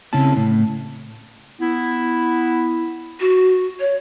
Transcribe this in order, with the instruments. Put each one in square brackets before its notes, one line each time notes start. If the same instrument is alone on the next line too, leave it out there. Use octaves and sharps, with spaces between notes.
[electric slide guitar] C#3 C4 C#4 E4 A5
A2
[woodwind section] B3 E4
[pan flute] F#4
C#5